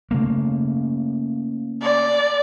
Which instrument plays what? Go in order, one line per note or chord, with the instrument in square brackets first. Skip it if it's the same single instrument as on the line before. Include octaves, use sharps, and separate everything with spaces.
[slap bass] C#3 A3 A#3
[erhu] D5